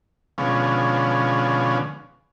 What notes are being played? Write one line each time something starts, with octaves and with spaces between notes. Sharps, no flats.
B2 D3 F3 G#3 C#4